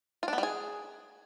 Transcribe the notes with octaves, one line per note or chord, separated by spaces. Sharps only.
F4
D4
B3
G3
G#4